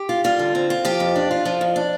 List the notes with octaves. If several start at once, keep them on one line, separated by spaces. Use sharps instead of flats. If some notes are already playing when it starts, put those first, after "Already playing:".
Already playing: G4
F4
G3 F4
D3
C4
F4
F3 G4
F2
D4
F4
F3
F2
D4